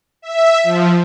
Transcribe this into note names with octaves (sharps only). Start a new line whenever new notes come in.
E5
F3